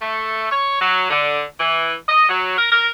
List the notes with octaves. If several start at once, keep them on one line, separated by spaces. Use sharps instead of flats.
A3
C#5
F#3
D3
E3
D#5
F#3
A#4
A#4